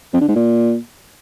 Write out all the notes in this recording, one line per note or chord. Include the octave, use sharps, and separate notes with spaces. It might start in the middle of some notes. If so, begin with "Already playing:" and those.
F2
D3
G#2
A#2